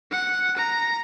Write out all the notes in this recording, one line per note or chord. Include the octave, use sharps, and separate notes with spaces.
F#5
A#5